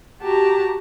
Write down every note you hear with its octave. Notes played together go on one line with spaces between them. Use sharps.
F#4 G4 A5 A#5